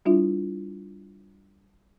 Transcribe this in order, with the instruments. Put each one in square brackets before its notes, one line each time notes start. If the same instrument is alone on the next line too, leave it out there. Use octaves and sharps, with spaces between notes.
[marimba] G3 D4 E4 F4 E5